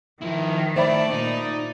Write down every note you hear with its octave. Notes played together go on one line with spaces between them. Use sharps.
D#3 F3 E4
A3 C5 D5 E5 B5
A#2 D#4